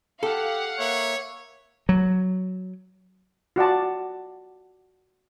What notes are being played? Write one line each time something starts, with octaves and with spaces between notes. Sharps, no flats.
G4 A4 F5 F#5
A#3 C#5 E5
F#3
F4 F#4 D5 A5